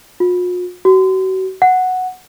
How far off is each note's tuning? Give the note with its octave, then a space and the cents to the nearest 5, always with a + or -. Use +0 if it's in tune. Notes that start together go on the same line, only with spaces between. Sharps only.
F4 +45
F#4 +35
F#5 -5